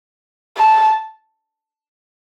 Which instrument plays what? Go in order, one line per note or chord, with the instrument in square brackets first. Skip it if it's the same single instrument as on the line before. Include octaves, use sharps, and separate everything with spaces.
[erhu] A5